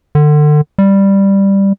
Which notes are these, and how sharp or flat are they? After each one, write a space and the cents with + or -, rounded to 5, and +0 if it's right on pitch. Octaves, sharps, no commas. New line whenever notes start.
D3 +30
G3 +5